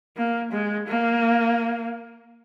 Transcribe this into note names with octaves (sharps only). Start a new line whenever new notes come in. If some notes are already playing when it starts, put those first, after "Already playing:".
A#3
G#3
A#3